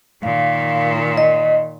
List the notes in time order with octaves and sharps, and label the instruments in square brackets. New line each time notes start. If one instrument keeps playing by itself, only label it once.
[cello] A#2 D#3 [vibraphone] F5
[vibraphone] D#5